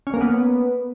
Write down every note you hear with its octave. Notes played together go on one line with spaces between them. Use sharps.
C#4
A#3
B3